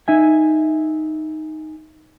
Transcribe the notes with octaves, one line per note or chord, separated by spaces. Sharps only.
D#4 E5 G#5